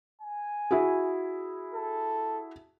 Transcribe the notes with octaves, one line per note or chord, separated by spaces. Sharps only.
G#5
E4 F#4 G#4
A4